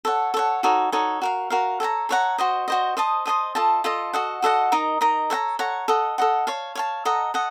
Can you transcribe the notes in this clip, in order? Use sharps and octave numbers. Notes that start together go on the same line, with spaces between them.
A4 C#5 F#5
A4 C#5 F#5
D#4 F#4 A4 C#5
D#4 F#4 A4 C#5
F#4 A#4 F5
F#4 A#4 F5
A4 C#5 F#5 A#5
A4 C#5 F#5 A#5
F#4 C5 D#5
F#4 C5 D#5
C5 D#5 A5 D#6
C5 D#5 A5 D#6
F4 A4 D#5 A5
F4 A4 D#5 A5
F#4 A4 D#5 F#5
F#4 A4 D#5 F#5
D#4 A#4 D#5 A#5
D#4 A#4 D#5 A#5
A4 C#5 F#5 A#5
A4 C#5 F#5 A#5
A4 D#5 F#5
A4 D#5 F#5
C#5 F5 A5
C#5 F5 A5
A4 D#5 F#5 A#5
A4 D#5 F#5